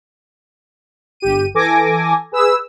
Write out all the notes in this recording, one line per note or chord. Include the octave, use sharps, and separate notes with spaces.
G1 G4 D#7
E3 A4 G#5 D6 A#6
G#4 B4 E6